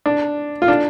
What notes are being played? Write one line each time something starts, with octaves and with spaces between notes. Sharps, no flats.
D4
F4
D4